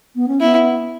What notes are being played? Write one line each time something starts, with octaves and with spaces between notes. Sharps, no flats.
B3
C#4
B3 E4